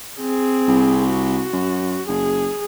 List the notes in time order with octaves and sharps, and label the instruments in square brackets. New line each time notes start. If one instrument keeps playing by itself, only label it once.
[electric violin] C4 G#4
[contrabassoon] C2
[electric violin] F#4
[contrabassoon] F#2
[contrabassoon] F#1 [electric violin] G#4